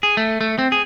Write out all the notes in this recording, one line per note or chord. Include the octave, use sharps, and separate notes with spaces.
G#4
A3
A3
C4
G#4